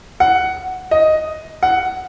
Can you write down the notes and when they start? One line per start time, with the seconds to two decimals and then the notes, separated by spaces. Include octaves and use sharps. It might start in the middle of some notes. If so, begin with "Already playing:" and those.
0.20 F#5
0.91 D#5
1.63 F#5